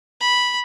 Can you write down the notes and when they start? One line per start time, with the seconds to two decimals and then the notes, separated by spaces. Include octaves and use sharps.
0.21 B5